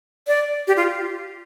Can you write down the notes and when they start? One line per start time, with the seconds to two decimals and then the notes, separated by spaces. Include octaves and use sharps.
0.27 D5
0.67 G4
0.77 F4